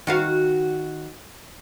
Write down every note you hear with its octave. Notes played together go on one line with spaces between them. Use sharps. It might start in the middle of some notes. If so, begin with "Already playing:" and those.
D#3 F#4 F5